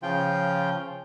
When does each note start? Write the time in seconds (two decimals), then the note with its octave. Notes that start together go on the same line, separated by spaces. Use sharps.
0.03 C#3 F3 F4 G5